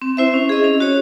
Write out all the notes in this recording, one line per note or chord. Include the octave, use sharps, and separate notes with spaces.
C4
E4 C5 E5
C#4
G#4 D#5
C#4
F#4 C#5